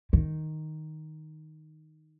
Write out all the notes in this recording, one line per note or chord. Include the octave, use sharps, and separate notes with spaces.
D#3